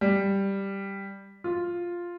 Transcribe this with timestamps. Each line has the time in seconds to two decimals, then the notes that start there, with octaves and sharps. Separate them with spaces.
0.01 G3
1.44 F4